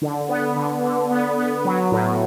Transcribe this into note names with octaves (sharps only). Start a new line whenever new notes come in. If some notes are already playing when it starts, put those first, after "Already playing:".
D3
B3
D3
D3
B3
B3
F#3
A2